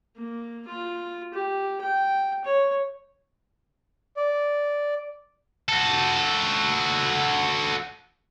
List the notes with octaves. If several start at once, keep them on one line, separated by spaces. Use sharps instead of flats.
A#3
F4
G4
G5
C#5
D5
F#4 A4